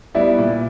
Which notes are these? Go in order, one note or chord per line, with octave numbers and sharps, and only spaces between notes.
G3 B3 E4 D5 E5
A#2